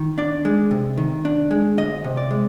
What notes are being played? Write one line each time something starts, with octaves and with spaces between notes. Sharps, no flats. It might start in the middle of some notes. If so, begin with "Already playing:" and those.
Already playing: D#3
D4 D5
G#3
C3
D#3
D4
G#3
D2 D#5
C3
D5
G#3